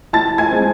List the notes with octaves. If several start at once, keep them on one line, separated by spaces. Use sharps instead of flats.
E3 A5 A6
G#5 G#6
G#3 C4